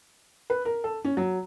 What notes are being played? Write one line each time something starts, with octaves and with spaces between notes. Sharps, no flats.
B4
A#4
A4
C#4
F#3